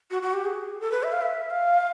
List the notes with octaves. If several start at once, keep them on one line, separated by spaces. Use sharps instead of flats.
F#4
F#4
G4
G#4
A4
B4
E5
F5
E5
F5